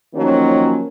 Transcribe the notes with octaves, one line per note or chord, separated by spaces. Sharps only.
D#3 F3 F#3 A#3 C#4